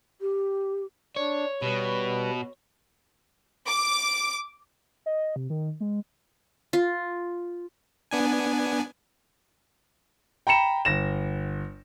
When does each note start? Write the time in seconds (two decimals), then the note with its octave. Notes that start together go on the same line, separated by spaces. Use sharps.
0.21 G4
1.16 D4 C#5
1.62 B2 G3 B4
3.68 D6
5.06 D#5
5.36 C3
5.50 D#3
5.80 G#3
6.73 F4
8.11 B3 D4 G#5
10.47 G5 A#5 B5 C#7 E7
10.85 G1 A#6 E7